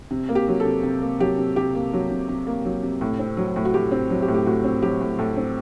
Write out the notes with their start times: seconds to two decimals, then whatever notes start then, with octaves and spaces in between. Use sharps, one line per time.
0.11 C3
0.29 A#3
0.35 G4
0.48 F#3
0.60 A4
0.66 C3
0.83 C3
1.02 A#3
1.20 F#3 G4
1.38 C3
1.56 C3 G4
1.75 A#3
1.93 F#3
2.11 C3
2.29 C3
2.47 A#3
2.65 F#3
2.83 C3
3.01 A2
3.19 C4
3.37 F#3
3.56 A2
3.65 F#4
3.74 A2 G4
3.91 C4
4.10 F#3
4.22 G4
4.28 A2
4.34 G4
4.46 A2 F#4
4.64 C4
4.82 F#3 G4
5.01 A2
5.19 A2 A4
5.37 C4